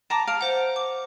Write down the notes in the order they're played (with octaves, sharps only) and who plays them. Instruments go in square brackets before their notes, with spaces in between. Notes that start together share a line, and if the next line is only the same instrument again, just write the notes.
[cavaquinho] A5 A#5 D6
[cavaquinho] F5 [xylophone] D7
[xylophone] C5 F#5
D6